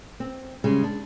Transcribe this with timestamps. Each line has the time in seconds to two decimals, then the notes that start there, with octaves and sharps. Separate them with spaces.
0.20 C4
0.64 C#3 G3 G#3
0.83 D4